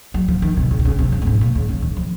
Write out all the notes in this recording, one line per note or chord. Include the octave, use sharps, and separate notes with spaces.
F#3
F3
D#3
C3
C#3
C3
C#3
C3
F2
A#2
G#2
A#2
C#3
C#3
D#3
F3